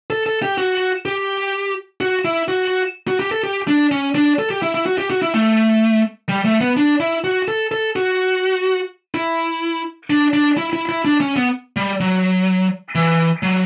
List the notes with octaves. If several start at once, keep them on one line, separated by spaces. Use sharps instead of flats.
A4
A4
G4
F#4
G4
F#4
E4
F#4
F#4
G4
A4
G4
D4
C#4
D4
A4
G4
E4
E4
F#4
G4
F#4
E4
A3
G3
A3
B3
D4
E4
F#4
A4
A4
F#4
E4
D4
D4
E4
E4
E4
D4
C#4
B3
G3
F#3
E3
F#3